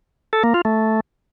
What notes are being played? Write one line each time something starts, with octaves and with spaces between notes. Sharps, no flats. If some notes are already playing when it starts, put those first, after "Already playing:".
A4
A#3
F4
A3